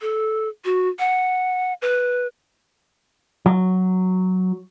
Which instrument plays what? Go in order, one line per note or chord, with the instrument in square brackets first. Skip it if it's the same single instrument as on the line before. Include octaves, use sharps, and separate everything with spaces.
[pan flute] A4
F#4
F#5
B4
[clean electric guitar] F#3